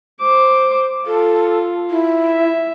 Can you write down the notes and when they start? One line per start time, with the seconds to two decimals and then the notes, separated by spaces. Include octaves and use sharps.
0.20 C5 D6
1.07 F4 A4
1.90 E4
2.28 E5